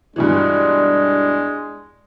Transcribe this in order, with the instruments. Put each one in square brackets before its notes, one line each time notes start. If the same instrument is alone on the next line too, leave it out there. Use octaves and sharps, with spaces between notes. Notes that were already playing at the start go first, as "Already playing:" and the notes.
[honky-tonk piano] G2 B2 E3 [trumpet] G#3 [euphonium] D4